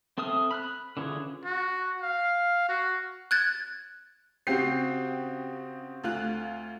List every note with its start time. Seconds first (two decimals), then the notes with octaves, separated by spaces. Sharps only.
0.18 C4 A4 E5 D#6 F6
0.51 B5 F6 F#6
0.97 D3 E3 C#4 F4 G#4
1.45 F#4
2.02 F5
2.69 F#4
3.31 F#6 G#6 A6
4.47 C#3 C4 F#4 G4 C7
6.04 D2 F4 F#6